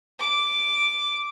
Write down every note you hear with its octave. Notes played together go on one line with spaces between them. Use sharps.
D6